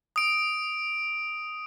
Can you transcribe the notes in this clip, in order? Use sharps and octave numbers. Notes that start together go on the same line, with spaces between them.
D#6 D7